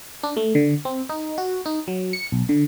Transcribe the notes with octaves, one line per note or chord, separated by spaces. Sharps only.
D4
A3
D3
C4
D#4
F#4
D#4
F#3
C#7
B1
D3